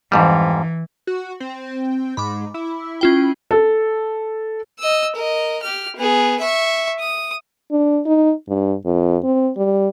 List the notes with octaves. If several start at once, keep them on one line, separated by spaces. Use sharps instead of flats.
F2 G#2 E3 G3
F#4
C4
G#2 B5 D6
E4
C#4 F4 G5
A4
D#5 E6
A#4 D#5
G4 F6
B3 G#4
E5 C#6
D#6
D4
D#4
G2
F2
C4
G3